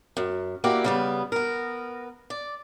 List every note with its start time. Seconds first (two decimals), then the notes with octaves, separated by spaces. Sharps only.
0.17 F#2
0.64 A#3 E4 F#4 G4 D5
0.84 C#3 G3 B3
1.32 B3 A#4
2.30 D5